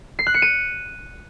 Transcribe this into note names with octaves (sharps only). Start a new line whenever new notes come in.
C7
F#6
C#7
D#7